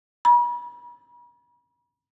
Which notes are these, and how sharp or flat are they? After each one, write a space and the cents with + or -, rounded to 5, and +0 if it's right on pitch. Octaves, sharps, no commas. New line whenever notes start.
B5 -45